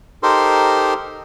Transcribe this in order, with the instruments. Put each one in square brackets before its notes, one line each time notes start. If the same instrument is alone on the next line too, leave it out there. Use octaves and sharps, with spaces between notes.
[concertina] D#4 G4 A4 A#4 C5 C6